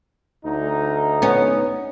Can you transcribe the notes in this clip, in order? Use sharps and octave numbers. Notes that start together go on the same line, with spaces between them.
D2 D#4
B3 C#4